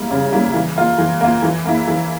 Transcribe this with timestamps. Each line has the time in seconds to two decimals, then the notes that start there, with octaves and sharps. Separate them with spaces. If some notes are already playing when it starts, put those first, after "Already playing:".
Already playing: G3 A#3 E4
0.11 C#3
0.33 G3 A#3 E4
0.54 E3
0.77 A#3 F4
0.98 E3
1.21 A#3 F4
1.42 E3
1.66 A#3 E4
1.88 E3